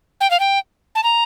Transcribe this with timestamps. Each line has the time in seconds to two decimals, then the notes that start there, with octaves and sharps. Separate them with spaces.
0.21 G5
0.31 F5
0.40 G5
0.95 A5
1.04 A#5